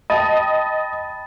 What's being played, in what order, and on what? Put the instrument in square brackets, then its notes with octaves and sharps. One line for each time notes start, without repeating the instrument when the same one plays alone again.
[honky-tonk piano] D#5 [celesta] G5 A5 D#6 [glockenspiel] B5 A6